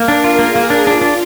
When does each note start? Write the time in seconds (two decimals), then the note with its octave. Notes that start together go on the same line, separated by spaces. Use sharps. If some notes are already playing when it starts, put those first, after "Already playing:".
Already playing: A#3 A#4
0.08 D4
0.24 F4
0.39 A#3 G#4
0.56 A#3
0.70 D4
0.87 D4 F4
1.01 D4